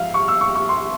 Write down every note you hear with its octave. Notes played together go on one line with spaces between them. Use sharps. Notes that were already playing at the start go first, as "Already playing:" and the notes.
Already playing: G#2 F3 E5 F5
C#6
E6
C#6
C#6
C6